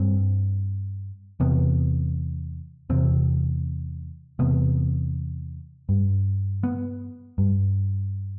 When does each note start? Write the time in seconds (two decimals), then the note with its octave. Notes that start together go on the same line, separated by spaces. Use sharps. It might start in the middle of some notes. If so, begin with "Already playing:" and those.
Already playing: G2 C4
1.40 E2 C3 B3
2.90 E2 C3 C4
4.39 E2 C3 B3
5.89 G2
6.63 B3
7.38 G2